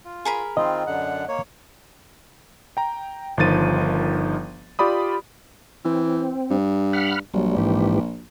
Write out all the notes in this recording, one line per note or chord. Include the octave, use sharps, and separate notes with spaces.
F4
G#4 A#4 B5
D#3 C4 F4 D#5
F#2 D3 F#5
A#3 C#5
G5 A#5
G1 D#3 F3 A6 D#7
F4 G4 D5 B5 D#6
E3 C4
G2
F#5 B5 F6
A#1 F#3 G3
G#2 E3 G4